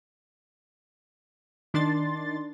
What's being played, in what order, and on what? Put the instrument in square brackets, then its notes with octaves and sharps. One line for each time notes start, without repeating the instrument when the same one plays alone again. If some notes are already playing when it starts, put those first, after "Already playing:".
[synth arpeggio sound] D#3 D4 C6 A6